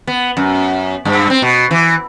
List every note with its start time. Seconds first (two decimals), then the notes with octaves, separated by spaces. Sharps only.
0.07 B3
0.37 F#2
1.05 G2
1.30 C4
1.42 B2
1.71 E3